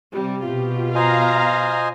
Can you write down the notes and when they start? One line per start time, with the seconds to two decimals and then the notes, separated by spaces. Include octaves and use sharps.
0.13 C3 G3
0.43 B2 F4 G4
0.95 C5 D#5 F5 G#5 A#5